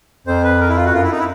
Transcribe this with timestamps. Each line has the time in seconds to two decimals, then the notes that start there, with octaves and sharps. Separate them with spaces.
0.27 F2 C5
0.44 B4
0.61 A#4
0.69 E4
0.77 F4
0.85 F#4
0.94 F#2 F4
1.03 E4
1.11 D#4
1.19 E4